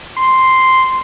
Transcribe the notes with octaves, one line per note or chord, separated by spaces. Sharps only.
C6